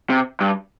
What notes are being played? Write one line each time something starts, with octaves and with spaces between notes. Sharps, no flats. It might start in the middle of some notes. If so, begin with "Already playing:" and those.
C3
G2